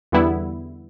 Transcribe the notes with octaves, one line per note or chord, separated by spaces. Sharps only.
E2 D3 G3 B3 E4